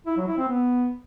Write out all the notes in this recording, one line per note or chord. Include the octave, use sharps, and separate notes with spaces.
E4
F#3
E4
C4
B3